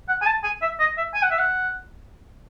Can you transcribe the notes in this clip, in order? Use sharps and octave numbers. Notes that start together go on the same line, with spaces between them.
F#5
G#5
A5
G#5
E5
D#5
E5
G#5
F#5
E5
F#5